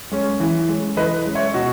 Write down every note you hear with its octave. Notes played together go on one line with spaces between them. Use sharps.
G#3 C#4
E3
G#3 C#4
E3 B4 D#5
G#3 C#4
C#5 E5
B2 D#4 F#4